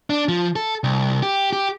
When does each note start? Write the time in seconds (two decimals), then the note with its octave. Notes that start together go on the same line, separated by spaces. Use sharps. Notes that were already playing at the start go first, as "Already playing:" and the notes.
0.10 D4
0.29 F3
0.56 A4
0.84 C2
1.23 G4
1.53 G4